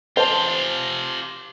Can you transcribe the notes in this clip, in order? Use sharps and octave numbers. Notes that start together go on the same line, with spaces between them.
F4 G4 C5 A5